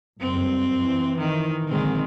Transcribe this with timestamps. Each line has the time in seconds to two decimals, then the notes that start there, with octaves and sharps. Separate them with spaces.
0.21 F#1 G2 C4
0.80 E3
1.19 D#3
1.68 A#1 D3 D#3 G#3 C4